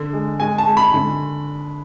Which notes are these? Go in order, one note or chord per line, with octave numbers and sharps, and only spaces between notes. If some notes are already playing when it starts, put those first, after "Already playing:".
Already playing: D3
G#3
G#3 G#5
A5
G#3
B5
D3